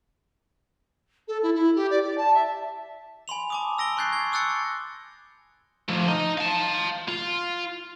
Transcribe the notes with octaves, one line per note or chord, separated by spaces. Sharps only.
A4
E4
E4
G4
D5
D5
A5
E5
G#5 B5 C6 F7
A5 D6 D#6
E6 A#6 D7 G7
C6 C#6 F#6 G6 A6 C7
G#6 G7
D6 E6 F#6 A6 C#7
F3 A3
D#4
F5 A5
F4